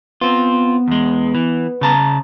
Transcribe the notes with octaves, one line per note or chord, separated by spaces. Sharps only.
B3 C4 F4
E2 G#3
E3
C#3 A5 A#5